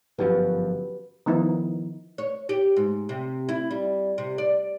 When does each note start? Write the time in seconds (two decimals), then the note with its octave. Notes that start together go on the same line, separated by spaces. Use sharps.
0.19 G1 F#2 F3 F#4 G4 B4
1.26 D#3 F3 B3 D#4 E4
2.18 C#5
2.49 G4
2.76 G#2
3.09 C3
3.49 E4
3.71 G3
4.18 C3
4.38 D5